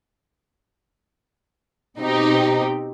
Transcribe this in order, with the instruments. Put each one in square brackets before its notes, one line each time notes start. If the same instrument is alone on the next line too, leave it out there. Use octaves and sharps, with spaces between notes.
[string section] B2 C4 D#4 G4